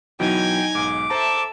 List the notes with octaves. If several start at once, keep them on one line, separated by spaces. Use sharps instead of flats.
B2 E3 F#3 D#4 G5 G#5
B1 G#2 D6
A4 C5 E5 A5 A#5